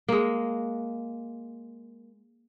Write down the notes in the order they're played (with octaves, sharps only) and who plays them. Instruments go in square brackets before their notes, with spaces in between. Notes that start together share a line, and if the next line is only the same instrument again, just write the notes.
[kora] G#3 A#3